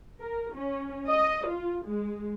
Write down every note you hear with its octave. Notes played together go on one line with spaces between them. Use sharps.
A#4
C#4
D#5
F4
G#3